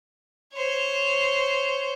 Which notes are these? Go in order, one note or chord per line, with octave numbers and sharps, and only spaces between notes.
C5 C#5